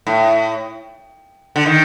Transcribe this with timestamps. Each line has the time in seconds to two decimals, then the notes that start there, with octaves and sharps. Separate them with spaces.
0.07 A2
1.56 D3
1.66 D#3